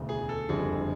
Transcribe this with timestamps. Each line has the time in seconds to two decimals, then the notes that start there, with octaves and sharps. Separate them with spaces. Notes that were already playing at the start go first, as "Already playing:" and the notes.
Already playing: E1 D2 C#3
0.09 G#4
0.29 A4
0.49 F#1 F2 D3 G3 G#4